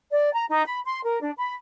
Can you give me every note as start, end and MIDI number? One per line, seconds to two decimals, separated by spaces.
0.11 0.32 74
0.32 0.44 82
0.49 0.64 63
0.66 0.79 83
0.85 1.01 84
1.04 1.20 70
1.22 1.31 62
1.37 1.53 83